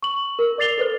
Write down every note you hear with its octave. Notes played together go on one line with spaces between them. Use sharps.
C#6 F#7
A#4
D5 D6 A6 C7 F7 G7
A4 B4 C5